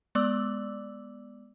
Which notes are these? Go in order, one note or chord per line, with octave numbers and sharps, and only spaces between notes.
G#3 B3 D5 D6 E6 F#7